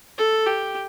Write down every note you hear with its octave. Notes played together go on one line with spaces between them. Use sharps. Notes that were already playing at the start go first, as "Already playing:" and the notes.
A4
G4